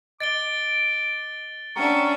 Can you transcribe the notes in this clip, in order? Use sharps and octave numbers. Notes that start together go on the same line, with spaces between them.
D#5 D6 A6 D7 G7
C#4 D4 E5 F#5 G5 A#5 C#6